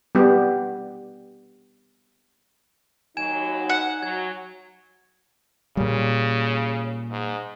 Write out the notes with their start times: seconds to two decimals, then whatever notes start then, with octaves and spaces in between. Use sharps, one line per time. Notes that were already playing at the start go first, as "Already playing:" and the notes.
0.15 G3 B3 G4
3.17 D#2 F#3 D#4 G#5 G#6 E7
3.69 F#5
4.03 F#3 G#6
5.77 A#2 C#3 G3
7.11 G#2